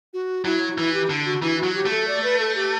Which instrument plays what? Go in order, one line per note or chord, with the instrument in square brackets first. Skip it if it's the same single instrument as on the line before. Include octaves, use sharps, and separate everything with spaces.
[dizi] F#4
[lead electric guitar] F#3 [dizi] E4
[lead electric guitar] E3 [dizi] E4
[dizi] G4
[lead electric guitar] D3
[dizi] F#4
[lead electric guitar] E3 [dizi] E4
[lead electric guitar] F#3 [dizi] F#4
[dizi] G4
[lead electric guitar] A3
[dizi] A4
D5
B4
A4
G4